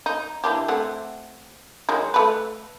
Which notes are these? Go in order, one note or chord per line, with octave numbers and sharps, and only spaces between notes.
D#4
E3 D4 G4
A3 C4 F#5
D#3 F#3 G#3
A3 B4